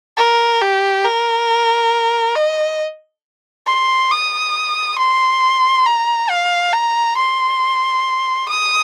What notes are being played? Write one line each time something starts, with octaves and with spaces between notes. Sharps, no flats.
A#4
G4
A#4
D#5
C6
D#6
C6
A#5
F5
A#5
C6
D#6